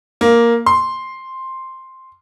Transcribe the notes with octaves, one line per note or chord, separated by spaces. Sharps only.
A#3
C6